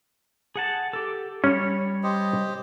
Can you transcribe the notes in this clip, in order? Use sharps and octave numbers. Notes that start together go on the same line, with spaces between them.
G#4 F#5 A5
G4 A4
G3 C#4 C#5
G4 C5 D#5